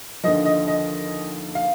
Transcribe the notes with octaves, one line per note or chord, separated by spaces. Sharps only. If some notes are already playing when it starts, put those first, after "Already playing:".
D#2 D3 F3 D#5
D#5
D#5
F5